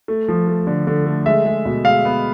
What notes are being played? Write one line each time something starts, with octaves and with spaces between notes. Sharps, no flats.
A3
F3
A3
D3
D3
A3
G#3 E5
G#3
B2
G#3 F5
B3